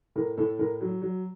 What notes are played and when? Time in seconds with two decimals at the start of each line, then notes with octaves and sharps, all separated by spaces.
0.16 A2 A#4
0.38 A2 A4
0.59 A2 A#4
0.81 F#3
1.02 F#3